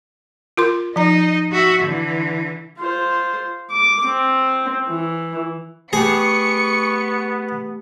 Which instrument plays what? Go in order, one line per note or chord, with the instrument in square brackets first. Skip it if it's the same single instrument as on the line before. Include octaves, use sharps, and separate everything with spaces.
[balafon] F4 A#4 C6
[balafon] F3 A#5 [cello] D#4 D#5
[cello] F#4 E5
D3 E3
[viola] F4 C5
D6
C4
E3
[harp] A3 G4 [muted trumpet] B3 [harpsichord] G#4 [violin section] C#6 C#7